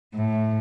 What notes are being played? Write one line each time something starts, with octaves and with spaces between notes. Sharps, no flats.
A2